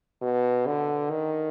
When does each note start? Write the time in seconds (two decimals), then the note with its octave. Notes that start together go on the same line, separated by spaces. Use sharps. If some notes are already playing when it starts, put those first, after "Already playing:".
0.22 B2
0.66 D3
1.10 D#3